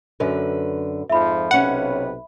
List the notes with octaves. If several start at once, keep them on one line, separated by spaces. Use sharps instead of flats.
F#2 D3 B4
F2 G#2 F3 E5 B5
B1 C3 C#4 B4 F5 F#5